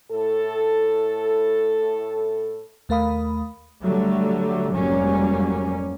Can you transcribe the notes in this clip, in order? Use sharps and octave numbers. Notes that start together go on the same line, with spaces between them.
A2 A4
D#2 A3 A#4 F5 B5 D#6
D3 F#3 G3 A3
F1 G#2 F#3 G3 A#3 C#4